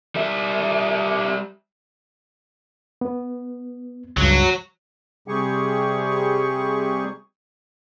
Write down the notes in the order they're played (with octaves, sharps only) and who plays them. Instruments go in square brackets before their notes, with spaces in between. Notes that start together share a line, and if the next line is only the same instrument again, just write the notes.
[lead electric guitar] G3 E5
[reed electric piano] B3
[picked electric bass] C#2 G2 [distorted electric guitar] F#3
[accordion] C3 G3 G4 G#4 C#6